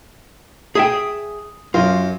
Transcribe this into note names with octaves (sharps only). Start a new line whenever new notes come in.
G#4 E5 G5 D#6
F#2 F4